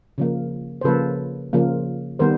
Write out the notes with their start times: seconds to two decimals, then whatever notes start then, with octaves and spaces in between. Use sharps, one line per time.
0.18 C#3 F3 A#3
0.81 C5
0.85 C#3 F3 A#3 A4 B4
1.53 C#3 F3 A#3
2.19 D#3 G3 B3 A#4 C5